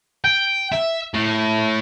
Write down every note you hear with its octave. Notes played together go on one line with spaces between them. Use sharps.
G5
E5
A2